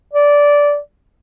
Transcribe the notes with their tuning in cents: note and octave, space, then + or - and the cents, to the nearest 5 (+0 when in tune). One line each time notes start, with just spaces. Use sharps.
D5 -15